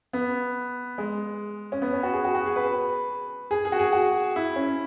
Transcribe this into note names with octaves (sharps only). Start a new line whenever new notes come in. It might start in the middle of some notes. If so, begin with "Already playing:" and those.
B3
G#3
C#4
B3
C#4
F#4
G#4
F#4
F#4
G#4
B4
G#4
G#4
F#4
G#4
F#4
E4
C#4